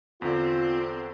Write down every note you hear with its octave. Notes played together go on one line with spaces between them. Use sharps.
E2 D3 C4 F4